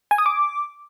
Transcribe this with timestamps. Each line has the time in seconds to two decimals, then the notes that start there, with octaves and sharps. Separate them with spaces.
0.11 G#5
0.18 D#6
0.26 D6